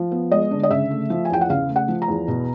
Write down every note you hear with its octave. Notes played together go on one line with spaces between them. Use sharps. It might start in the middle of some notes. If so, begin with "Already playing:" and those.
Already playing: F3
B3
G#3 D#5
D3
D#5
C#3 E5
A3
F3
G#5
E2 G5
F#5
C#3 F5
A3
F#5
F3
A#5
E2
B2